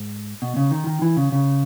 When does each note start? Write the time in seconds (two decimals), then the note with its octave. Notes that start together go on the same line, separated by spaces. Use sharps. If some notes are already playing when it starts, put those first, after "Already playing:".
Already playing: G#2
0.42 B2
0.56 C#3
0.71 D#3
0.87 D#3
1.02 E3
1.17 C#3
1.32 C#3